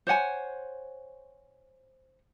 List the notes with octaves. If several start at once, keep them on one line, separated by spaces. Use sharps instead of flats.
C5 C#5 F#5 G#5